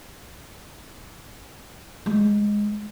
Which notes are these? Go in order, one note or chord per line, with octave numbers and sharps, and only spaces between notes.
G#3